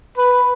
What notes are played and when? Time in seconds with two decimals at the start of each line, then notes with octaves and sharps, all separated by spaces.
0.18 B4